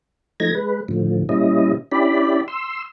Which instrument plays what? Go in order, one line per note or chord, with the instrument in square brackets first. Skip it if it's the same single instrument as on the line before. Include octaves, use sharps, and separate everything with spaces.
[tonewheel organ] F3 A3 D#4 G#6 A#6
G#3 B4
A2 D3 F3
A#2 G3 C#4 E4 D#5
C#4 D4 E4 G4 D5 B5
C6 E6